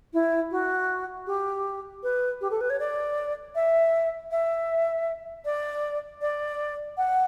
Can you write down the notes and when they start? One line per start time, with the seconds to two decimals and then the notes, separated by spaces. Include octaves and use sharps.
0.13 E4
0.51 F#4
1.27 G4
2.03 B4
2.41 G4
2.51 A4
2.61 B4
2.70 C#5
2.79 D5
3.55 E5
4.31 E5
5.45 D5
6.21 D5
6.97 F#5